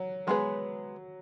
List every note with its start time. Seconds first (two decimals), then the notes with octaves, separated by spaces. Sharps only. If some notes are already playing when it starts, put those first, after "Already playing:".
Already playing: F#3
0.27 F#3 G#3 B3 G#4 B4